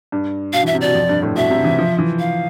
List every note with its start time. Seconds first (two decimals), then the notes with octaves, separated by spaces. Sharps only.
0.12 G2
0.53 B2 F5
0.63 E3 E5
0.74 C3
0.81 B2 D5
0.95 F2
1.09 G2
1.22 A2
1.36 B2 E5
1.50 C3
1.64 E3
1.78 F3
1.98 E3
2.19 F5